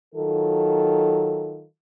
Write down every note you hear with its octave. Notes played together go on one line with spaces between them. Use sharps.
D#3 F#3 F4 A4